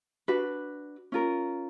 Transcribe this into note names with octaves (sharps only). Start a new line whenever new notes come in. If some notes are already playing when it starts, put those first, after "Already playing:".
D4 F#4 B4
C#4 F4 A#4